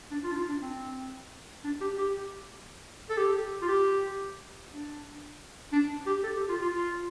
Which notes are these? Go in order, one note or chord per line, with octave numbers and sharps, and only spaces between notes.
D4
F4
D4
F4
D4
C4
D4
G4
G4
A4
G4
F4
G4
D4
D4
G4
A4
G4
F4
F4
F4